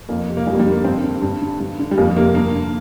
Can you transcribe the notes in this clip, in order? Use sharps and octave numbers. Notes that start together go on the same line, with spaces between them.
F2 A#3
C3
A#3
F2 G3
A#3
G3
D3
A#3
G2 C4
D3
G2
D3
G2
D3
G3
F2 A#3
C3 A#3
G2 A#3
D3